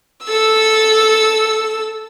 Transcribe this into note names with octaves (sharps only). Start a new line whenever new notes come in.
A4 E6